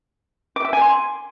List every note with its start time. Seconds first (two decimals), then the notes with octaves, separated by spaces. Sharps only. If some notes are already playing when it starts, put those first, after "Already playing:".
0.56 D6
0.65 E5
0.73 G#5
0.81 C6